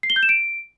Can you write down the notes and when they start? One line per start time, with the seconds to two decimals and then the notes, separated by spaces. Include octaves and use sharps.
0.03 C7
0.10 G7
0.16 G6
0.23 E7
0.29 D7